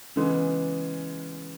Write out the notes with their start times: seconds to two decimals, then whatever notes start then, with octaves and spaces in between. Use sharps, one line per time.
0.16 C#3 E3 G#3 B3